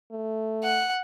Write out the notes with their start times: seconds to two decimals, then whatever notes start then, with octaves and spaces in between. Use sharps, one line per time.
0.12 A3
0.63 F#5